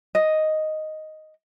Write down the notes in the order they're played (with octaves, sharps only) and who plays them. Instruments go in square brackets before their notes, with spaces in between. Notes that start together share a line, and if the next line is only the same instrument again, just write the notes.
[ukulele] D#5